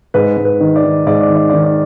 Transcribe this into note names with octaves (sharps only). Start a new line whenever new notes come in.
G#2 B4
G#2
B4
D#3
D5
D#3
G#2 D5
D5
D#3
D5
D5
D#3
D5